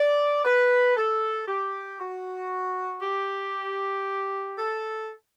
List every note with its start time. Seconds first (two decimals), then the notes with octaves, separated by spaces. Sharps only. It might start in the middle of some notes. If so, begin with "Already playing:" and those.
Already playing: D5
0.45 B4
0.97 A4
1.48 G4
2.00 F#4
3.02 G4
4.58 A4